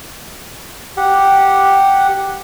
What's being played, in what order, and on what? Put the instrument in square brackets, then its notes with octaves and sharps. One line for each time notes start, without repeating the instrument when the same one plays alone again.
[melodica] G4 F#5